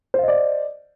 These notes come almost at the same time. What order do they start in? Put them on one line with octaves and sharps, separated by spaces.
C5 F5 D#5 D5